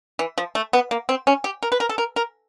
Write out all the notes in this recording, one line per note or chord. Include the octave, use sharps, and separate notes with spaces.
E3
F3
A3
B3
A#3
C4
C#4
G4
A#4
B4
A#4
A4
A#4
A#4